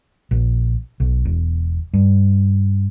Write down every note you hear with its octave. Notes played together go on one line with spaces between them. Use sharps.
A#1
B1
E1
G2